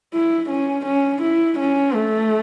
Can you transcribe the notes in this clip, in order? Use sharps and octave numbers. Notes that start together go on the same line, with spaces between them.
E4
C#4
C#4
E4
C#4
A3